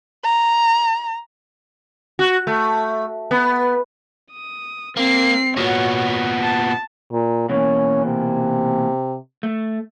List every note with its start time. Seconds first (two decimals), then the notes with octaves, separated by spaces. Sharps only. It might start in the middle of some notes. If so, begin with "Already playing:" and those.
0.24 A#5
2.19 F#4
2.47 A3
3.31 B3
4.32 D#6
4.97 A#3 C4 C7
5.57 A#2 B3 F#4 C#5
6.42 A5
7.11 A#2
7.50 B2 E3 A#3 C#4
8.05 C3
9.43 A3